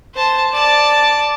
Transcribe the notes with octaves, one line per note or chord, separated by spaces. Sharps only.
C5 A5
D5 A5